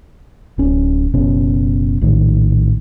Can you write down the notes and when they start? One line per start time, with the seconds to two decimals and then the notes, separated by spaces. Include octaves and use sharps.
0.58 D1 C#4
1.14 F#1 B2 C#4
2.01 A#1 A2 D#3